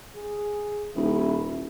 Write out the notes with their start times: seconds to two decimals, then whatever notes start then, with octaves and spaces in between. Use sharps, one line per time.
0.16 G#4
0.96 D#1 E4